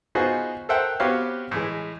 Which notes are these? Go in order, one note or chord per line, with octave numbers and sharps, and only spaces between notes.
B3 D#4 F4 F#4 G#4 C5
A4 A#4 C5 E5 F#5 G5
B3 C4 F#4 G4 C#5 F5
A2 E3 G#3